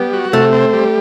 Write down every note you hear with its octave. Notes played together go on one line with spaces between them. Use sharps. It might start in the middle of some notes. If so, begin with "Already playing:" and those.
Already playing: G3 B3
F#4
C3 A3
C4
G3